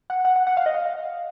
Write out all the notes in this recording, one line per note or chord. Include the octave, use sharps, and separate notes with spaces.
F#5
F#5
F#5
F#5
F5
D#5
F5